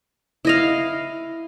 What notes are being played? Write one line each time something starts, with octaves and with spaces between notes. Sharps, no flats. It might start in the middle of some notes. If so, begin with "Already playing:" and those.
E4 D#5 F5